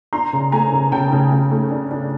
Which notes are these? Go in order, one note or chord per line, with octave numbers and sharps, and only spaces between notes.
D4 A#5 C6
C#3
A3 G#5 A#5
C#3
C#3 G5 A5
C#3
C#3
A3
D4
D4